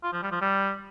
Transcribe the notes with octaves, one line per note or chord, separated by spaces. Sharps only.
F4
F3
G3
F3
G3